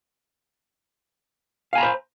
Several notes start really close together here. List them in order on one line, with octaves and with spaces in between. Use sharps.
F5 G#5 A#5 B5 C5